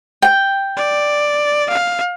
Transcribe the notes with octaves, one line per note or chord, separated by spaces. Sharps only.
G5
D5
F5